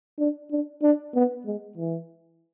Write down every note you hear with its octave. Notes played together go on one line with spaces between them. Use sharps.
D4
D4
D4
B3
G#3
E3